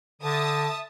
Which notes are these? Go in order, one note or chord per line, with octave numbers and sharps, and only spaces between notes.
D3 E5 A5 D#6